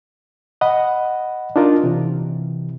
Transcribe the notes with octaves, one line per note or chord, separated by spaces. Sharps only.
D#5 F#5 B5
D4 D#4 F4 A#4
C3 E3